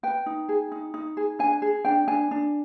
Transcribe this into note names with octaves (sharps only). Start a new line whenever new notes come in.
B4 G5
D#4
G#4
D#4
D#4
G#4
D4 G#5
G#4
D4 G5
D4 G#5
D4